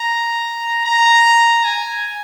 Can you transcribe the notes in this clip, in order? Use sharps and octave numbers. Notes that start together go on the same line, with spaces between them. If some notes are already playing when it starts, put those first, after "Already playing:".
Already playing: A#5
A#5
G#5